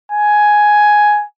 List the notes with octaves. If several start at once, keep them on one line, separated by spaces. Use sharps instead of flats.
G#5